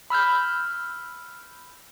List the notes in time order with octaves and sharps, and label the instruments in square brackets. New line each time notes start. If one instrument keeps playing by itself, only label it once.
[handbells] B5 E6 F6 G6